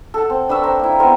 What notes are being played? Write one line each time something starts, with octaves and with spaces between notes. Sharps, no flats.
A4 F#5 A5
C4
D4 B4 C#6 E6
C4 A#4 G5 C6
A#3 E4
G#3 B3 C4 A#4